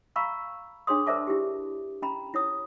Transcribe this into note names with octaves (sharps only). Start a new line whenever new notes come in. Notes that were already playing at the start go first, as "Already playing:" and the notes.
F5 A#5 B5 C#6 E6
D4 G#4 C#5 C6 D#6
A#4 C5 D5 E5 A5 D6
E4 G4
C#4 A#5 B5
E4 C#5 D#6